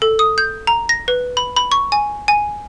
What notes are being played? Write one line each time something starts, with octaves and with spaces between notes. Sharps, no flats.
A4
D#6
G6
A#5
A#6
B4
B5
B5
C#6
G#5
G#5